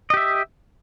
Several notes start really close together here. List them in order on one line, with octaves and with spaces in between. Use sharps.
D#5 G4 E5